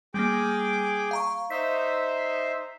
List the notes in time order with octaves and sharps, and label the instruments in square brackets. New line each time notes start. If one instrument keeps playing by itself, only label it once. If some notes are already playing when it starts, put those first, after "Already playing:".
[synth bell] G3 A#3 [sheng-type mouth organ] G#4 G5 D6
[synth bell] F5 A#5 C#6
[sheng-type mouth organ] D#4 C5 E5 [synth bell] B6